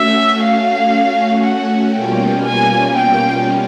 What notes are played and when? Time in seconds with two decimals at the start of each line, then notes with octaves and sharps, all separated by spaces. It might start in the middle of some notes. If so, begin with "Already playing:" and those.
Already playing: A3 C#4 F#4 E5
0.42 F5
1.44 F#5
1.94 B2 G3 A#3 C#4 F4 G5
2.46 G#5
2.96 G5